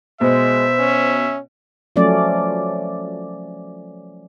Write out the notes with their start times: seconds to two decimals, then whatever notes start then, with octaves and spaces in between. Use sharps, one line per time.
0.21 B2 G#3 C5 E5
0.79 C#4
1.96 F3 F#3 A3 C#4 D5